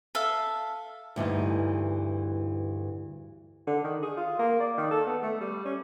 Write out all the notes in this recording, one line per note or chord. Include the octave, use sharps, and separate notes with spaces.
A4 E5 F5
D2 G2 E3 D#4
D3
D#3
G#4
F4
A#3
D5
D#3
A4
B3
A3
G3
C#4